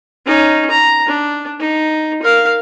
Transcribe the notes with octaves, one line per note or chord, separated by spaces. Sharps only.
C#4 D#4
A#5
D4
D#4
A#4 F5